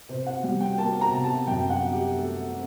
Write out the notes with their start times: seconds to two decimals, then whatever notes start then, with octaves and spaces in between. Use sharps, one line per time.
0.09 C3 C5
0.26 F#5
0.44 G3
0.61 G5
0.78 A#3 A5
1.01 A#5
1.13 C3
1.24 A5
1.47 F#2 G5
1.70 F#5
1.82 D3
1.93 G4
2.16 A3 A4
2.51 C4